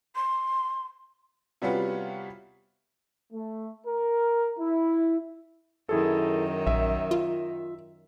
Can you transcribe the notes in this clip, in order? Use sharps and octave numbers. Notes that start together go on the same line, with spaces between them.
C6
C3 G3 B3 C#4 F4 F#4
A3
A#4
E4
F#2 D#3 E4 G#4 A4
A#1 E5
F4